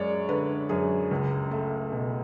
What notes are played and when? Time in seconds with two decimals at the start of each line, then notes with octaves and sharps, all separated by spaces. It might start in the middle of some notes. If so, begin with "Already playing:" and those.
Already playing: F#2 G#3 C#5 D5
0.29 D3 B4
0.69 F#2 G#4
1.11 C#2
1.51 A3
1.92 B2